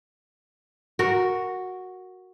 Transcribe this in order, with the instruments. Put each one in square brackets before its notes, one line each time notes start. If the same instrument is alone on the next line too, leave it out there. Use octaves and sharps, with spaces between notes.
[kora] F#4 A#4